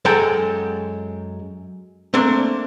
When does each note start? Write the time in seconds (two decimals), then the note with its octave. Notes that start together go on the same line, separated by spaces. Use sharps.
0.05 F#2 G#3 G#4 A4 G5 A#5
2.14 A3 A#3 C4 D4